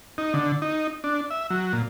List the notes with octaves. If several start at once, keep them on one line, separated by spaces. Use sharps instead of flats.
D#4
D3
D#4
D4
E5
F#3
A#2